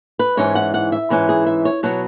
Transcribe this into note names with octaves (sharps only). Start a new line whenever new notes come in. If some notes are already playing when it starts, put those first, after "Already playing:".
B4
G#2 E3 C#4 C#5
F#5
F#5
E5
G#2 E3 C#4
G#4
E5
C#5
B2 F#3 B3 C#5